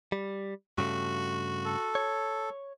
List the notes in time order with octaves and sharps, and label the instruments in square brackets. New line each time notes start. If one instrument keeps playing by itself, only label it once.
[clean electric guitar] G3
[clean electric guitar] G2 C#3 A3 [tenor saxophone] F#4
[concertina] A4
[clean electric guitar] C#5